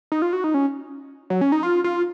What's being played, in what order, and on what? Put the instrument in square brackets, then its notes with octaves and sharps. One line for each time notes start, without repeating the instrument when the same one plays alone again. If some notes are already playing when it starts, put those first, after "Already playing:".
[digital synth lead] D#4
F4
F#4
D#4
C#4
F#3
C#4
D#4
F4
F4